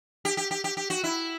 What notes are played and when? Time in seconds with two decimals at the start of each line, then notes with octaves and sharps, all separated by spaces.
0.25 G4
0.37 G4
0.51 G4
0.64 G4
0.77 G4
0.90 F#4
1.04 E4